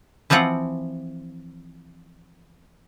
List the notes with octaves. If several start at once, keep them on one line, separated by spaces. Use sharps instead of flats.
E3 F3 C4 F4 F#5